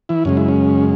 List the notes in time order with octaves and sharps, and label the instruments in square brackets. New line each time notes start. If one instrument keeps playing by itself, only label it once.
[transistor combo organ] E3 E4
F#2 C#3 G#3 C#4
E4
C#4